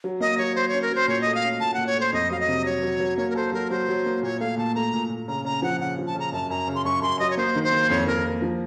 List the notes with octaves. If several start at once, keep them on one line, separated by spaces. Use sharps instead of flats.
F#3
A#3 D#5
F#3 C#5
F#3 C5
C#4 C#5
A#4
F#3 C5
A#2 C#5
D#5
A3
F5
C#4
A#2 A5
A#2 F#5
C#5
A3
C5
F2 D#5
F#3 F5
D#5
C3
F#3 C#5
F#3
F#3
A#3 C#5
A#4
A4 C5
F#3 A#4
F#3 C5
F#3
A#3
A#2 C#5
A3 F5
A#2 A5
A3 A#5
A#2
A#2
C#3 A#5
C#3 A#5
F3 F#5
C#3 F#5
F3
A5
C#3 A#5
F#2 A5
F#2 A#5
C#3
C6
F#2 C#6
F#2 C6
F#3 D#5
C#5
A#3 C5
D#3
C5
A#3
F2 C#5
F2 A#4
A#3
F3